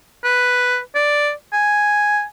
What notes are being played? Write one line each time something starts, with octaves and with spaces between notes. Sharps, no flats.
B4
D5
G#5